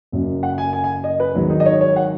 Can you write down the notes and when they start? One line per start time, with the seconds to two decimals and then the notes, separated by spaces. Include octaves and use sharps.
0.12 F#1 F#2 F#3
0.43 F#5
0.58 G#5
0.73 G#5
0.84 G#5
1.04 D#5
1.20 B4
1.35 G#1 G#2 D#3 F#3
1.50 D#4
1.60 D#5
1.66 C#5
1.81 C#5
1.96 F#5